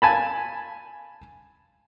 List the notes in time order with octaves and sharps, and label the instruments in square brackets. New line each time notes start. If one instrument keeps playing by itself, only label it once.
[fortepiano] G#5 A5 B5